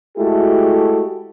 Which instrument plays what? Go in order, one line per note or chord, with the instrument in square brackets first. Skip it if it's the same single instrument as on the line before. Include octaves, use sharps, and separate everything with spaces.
[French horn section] G#3 A3 E4 F#4 G4 A4